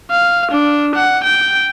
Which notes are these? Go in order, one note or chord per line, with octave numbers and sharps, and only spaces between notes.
F5
D4
F#5
G5